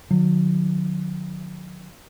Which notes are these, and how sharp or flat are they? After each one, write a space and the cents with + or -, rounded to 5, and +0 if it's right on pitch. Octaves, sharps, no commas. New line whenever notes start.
D3 +45 F#3 -35